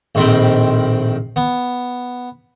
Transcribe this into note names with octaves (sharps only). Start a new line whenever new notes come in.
A#1 A2 D#3 C4 B5 C6
B3